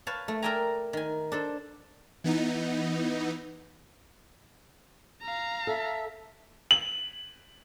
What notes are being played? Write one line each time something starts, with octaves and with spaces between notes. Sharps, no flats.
B4 C#5 F5 A5
A3
A#4 D5 E5 G5 G#5 A#5
D#3 G#5
D4 A4 C5
E3 B3 D#4
F5 A#5
A4 E5
F#7